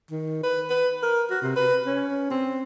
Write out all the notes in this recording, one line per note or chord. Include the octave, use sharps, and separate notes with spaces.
D#3
B4
B4
A#4
F#4
C3
B4
C#4
C4